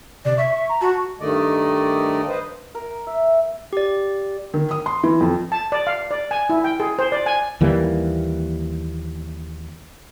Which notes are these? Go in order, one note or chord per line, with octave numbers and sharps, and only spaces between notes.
C3 D5
E5 C#6
C#6
A#5
F#4 A5
G2 D#3 A3 D5 D#5
B4 C5 D#5
A#4
E5
G4 D5
D#3
D#6
C6
E3
F2
A5
D5
F5
D5
G#5
E4
G5
G#4
C5
D5
G#5
D#2 E3 G3 A#3